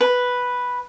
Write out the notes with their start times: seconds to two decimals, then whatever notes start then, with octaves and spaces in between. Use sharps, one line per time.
0.01 B4